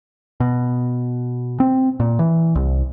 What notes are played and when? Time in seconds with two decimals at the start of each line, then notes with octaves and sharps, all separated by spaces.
0.40 B2
1.60 C4
2.00 A#2
2.19 E3
2.55 C2